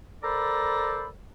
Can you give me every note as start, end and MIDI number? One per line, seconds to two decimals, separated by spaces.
0.23 1.08 69
0.23 1.08 70
0.23 1.08 72
0.23 1.08 74
0.23 1.08 82
0.23 1.08 83